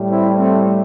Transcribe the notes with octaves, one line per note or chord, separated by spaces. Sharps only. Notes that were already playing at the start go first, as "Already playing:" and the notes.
Already playing: A2 G3
C4 E4
A3 C4